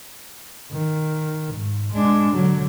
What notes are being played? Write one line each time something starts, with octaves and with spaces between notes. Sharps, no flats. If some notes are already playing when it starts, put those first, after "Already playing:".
D#3
G#2
G#3 D4
D3 F#3